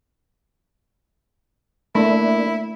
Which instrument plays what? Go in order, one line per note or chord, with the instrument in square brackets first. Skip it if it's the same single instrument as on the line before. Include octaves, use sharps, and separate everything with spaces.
[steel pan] A3 [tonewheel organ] A#3 D4 [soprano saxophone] E4